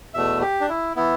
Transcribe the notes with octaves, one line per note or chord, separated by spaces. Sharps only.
E2 B2 A3 E5
G4
D4
E4
E3 B3 E4